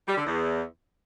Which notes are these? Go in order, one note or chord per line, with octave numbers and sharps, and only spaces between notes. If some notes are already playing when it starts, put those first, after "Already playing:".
G3
D3
E2